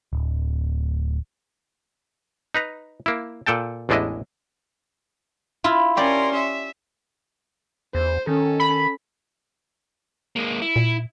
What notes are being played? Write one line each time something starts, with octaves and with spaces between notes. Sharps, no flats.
D1
D#4 B4 A#5
A#3 E4
A#2 A4 G5 A5
A1 E2 G#3 D4 E4 D#5
E4 F4
C#4 G4 A#4 D5 C6
E5
E2 C5
D#3 C#4 A4
B5
G#3 A#3
E4
A#2